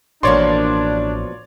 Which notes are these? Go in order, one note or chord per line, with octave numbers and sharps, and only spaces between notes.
A1 B2 F3 A#3 D4 C#5 D5 C6